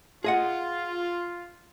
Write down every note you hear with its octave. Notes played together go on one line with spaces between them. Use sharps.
F4 G#4 D#5 F#5